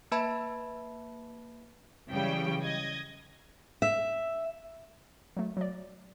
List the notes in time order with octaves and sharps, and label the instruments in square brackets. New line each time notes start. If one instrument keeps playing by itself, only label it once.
[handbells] A#3 B4 E5 A5 B5 G#6
[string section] C#3 E3 F#3 G3 G5
D#5 G#6
[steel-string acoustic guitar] E5
[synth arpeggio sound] F#3 A3
F#3 D5